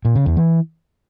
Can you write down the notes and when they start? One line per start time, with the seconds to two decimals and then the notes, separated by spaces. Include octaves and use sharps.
0.05 A#2
0.15 C#3
0.26 E2
0.37 E3